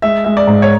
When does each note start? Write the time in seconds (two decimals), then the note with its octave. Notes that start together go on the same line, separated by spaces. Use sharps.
0.02 G#3 E5
0.24 G#3 E5
0.37 D5
0.47 G#2
0.62 C#5